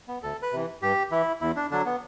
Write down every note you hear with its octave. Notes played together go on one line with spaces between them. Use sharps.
B3
D2 A4
B4
C3 E3
G2 G4
E3 E4
E2 E4
D4
D3 F#3 D4
B3